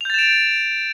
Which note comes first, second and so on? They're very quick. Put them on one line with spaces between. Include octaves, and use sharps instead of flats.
F7 G6 A6 E7 D7